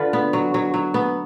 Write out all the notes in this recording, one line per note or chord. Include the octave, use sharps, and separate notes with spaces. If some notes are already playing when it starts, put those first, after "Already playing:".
Already playing: D3 F4 B4
B3
F#3
F#3
F#3
B3